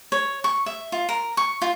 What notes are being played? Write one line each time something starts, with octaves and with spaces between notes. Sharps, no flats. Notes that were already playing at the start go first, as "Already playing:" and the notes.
C#5
C#6
E5
F4
A#4
C#6
F4